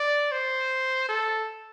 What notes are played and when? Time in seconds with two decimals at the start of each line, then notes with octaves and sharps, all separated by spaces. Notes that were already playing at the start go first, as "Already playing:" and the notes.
Already playing: D5
0.32 C5
1.09 A4